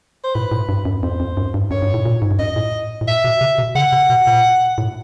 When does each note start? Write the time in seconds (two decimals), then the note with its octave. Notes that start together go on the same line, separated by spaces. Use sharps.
0.24 C5
0.34 A2 B4
0.51 A2
0.69 G2
0.85 F#2
1.03 F2 C5
1.20 F2
1.37 F#2
1.54 G2
1.71 F#2 C#5
1.82 G2
1.94 A2
2.06 A#2
2.13 A2
2.22 G#2
2.31 G2
2.39 F#2 D#5
2.56 A2
3.01 A2
3.07 A#2 E5
3.24 B2
3.41 C3
3.58 B2
3.75 C#3 F#5
3.93 C3
4.10 B2
4.27 A#2
4.78 A2